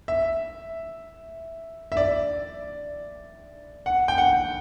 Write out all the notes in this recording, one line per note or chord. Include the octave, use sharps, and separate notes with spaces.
E5
E5
D5
F#5
G5
F#5